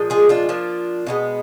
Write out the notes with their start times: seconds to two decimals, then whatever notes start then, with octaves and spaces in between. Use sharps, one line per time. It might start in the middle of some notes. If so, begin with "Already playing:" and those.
Already playing: A#2 F3 G#3
0.10 F4 G#4
0.29 D4 F4
0.49 F3 A#3 D4
1.07 B2 G#3 B3